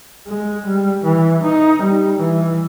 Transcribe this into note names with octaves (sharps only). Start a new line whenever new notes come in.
G#3
G3
E3
D#4
G3
E3